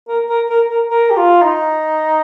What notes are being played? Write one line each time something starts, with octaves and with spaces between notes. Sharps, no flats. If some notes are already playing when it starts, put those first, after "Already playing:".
A#4
A#4
A#4
A#4
A#4
G4
F4
D#4